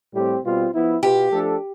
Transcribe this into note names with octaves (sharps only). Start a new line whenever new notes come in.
A2 G3 C4 G4
B2 G3 C4 F4
F3 B3 E4
B2 B3 F4 G4
F3 A3 D4 A4